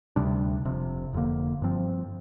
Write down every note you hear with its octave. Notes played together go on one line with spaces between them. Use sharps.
D2 C3 G3 D4
F1 F2 C3
F1 F2 D3 A#3
G2 F3 C4